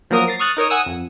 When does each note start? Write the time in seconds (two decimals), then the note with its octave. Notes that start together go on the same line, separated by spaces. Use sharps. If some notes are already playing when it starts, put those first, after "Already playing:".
0.10 F3 F#3 A#3 A#4 D#6
0.28 A6 A#6 C7
0.39 C#6 D#6 F6 F#6 A6
0.57 D#4 A#4 C#5 D#6
0.70 F#5 G#5 D#6 E6 D#7
0.86 F2